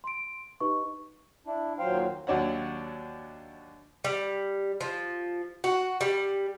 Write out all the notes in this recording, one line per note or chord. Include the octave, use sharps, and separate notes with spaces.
C6 D7
D#4 G4 B4 D#5 C#6
D4 E4
D#2 A#2 F#3 C5 F5 G5
D#2 F#3 D4 C#5 F#5
G3
F3
F#4
G3